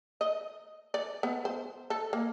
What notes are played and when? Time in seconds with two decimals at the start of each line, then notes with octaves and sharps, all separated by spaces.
0.21 D#5
0.94 D5
1.23 B3
1.45 C5
1.90 A4
2.13 A#3